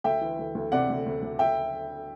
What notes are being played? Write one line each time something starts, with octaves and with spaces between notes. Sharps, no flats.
D2 E5 G5
E3
D2
D2
C3 D5 F#5
D2
D2
D2
E5 G5